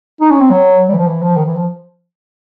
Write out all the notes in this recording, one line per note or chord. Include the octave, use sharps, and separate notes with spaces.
D#4
C#4
C4
F#3
G3
E3
F3
E3
F3
D#3
E3
F3